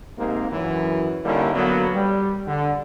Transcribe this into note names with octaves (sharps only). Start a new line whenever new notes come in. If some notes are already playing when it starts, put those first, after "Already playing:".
G#2 C3 A#3
F#2 E3
D3 G3 A#3 C#4 D#4 E4
D3 F#3 A#3 B3
G3
D3